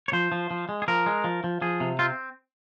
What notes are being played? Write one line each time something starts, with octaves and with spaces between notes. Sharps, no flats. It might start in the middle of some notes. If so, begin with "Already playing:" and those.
C#5
F3 C5
F3
F3
G#3
G#4
F3 A#4
G#3
F3
F3
F3 G#4
C3
C4 F4